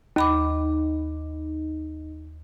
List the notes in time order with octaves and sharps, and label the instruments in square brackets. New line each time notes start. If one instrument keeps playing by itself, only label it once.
[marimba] D#2 B5 D6 [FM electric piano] D#4